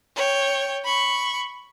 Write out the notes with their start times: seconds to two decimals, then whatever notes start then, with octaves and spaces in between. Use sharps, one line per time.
0.16 C#5 G5
0.85 B5 C#6